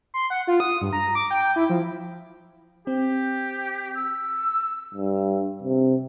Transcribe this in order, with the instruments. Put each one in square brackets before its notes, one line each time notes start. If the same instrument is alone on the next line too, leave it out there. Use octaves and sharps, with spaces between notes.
[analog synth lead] C6
F#5
F4
D#6
G2
A#5
D6
G5
E4
F3
[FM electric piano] C4 [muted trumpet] G4
[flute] E6
[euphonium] G2
C3